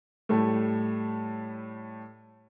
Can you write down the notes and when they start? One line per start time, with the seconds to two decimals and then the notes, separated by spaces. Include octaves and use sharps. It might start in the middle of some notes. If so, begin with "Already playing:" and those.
0.29 A2 G3 A3